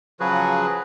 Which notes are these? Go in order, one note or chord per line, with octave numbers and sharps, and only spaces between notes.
C#3 F3 F#3 F#4 G#4 B4